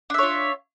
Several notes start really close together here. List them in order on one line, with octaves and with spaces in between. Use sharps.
D4 E5 C#5 F4